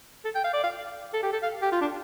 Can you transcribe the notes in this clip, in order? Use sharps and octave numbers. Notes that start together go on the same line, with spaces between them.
A4
G5
F5
D5
F5
A4
G4
A4
F5
G4
F4
D4